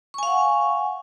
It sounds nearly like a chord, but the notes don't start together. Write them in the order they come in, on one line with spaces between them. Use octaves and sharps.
C#6 G#5 F5 F#5